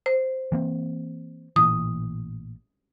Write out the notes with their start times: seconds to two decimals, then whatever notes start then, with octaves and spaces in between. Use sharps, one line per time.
0.06 C5
0.52 E3 A#3 C4
1.56 A1 A#2 E3 D#6